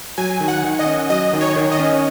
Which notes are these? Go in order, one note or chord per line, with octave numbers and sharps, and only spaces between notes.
F#3 G#5
D#3
F#5
D#3
D#5
C#4
F#3 D#5
D#3
C#5
D#3
D#5
C#4